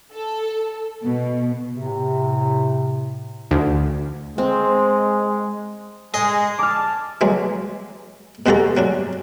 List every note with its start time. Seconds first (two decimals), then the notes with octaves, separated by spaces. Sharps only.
0.13 A4
1.04 B2
1.73 A2 C3
3.51 D2
4.38 G#3 C4
6.14 G#3 G#4 D#5
6.59 A5 D6 F6
7.21 E3 F#3 G#3
8.46 E2 G#3 F#4 G4 A4 A#5
8.77 F#3 C#4 D4